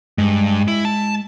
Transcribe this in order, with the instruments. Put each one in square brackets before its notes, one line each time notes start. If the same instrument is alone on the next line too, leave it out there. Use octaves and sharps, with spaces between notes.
[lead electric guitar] G2 [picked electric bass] G#3
[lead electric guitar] E4
A5